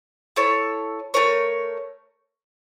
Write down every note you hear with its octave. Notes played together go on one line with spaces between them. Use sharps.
E4 A4 C#5
A3 E4 A#4 C#5